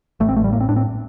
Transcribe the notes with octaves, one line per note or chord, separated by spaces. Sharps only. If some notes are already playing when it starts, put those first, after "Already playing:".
A1 A3
C4
A1 A3
G3
A2 A#3
C4
A2 D4
C4